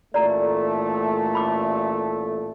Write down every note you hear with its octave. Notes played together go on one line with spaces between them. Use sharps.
A1 A#2 A3 D5 A#5
B5 D6